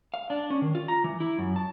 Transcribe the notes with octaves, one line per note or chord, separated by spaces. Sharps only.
F5
D4
C#4
D#3
F4
A#5
E3
E4
F#2
A5